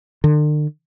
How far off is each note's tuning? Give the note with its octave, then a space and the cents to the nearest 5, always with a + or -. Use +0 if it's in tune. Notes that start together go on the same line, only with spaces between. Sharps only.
D3 +40